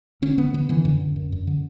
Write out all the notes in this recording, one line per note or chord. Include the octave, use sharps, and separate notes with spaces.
D3 C#4
D3 B3
D3 B3
D3 E3
F#2 D3
D3
F#2
F#2
D3